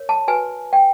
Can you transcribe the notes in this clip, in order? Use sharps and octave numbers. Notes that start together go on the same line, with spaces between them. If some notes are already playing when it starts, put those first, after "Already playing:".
Already playing: A#4 C#5
A5
F#4 B4 G#5
G5